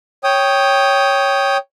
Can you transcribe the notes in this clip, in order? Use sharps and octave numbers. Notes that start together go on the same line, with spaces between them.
C#5 G5 D#6